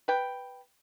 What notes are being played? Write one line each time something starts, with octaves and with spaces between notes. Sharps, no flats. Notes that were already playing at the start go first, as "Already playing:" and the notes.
B4 G5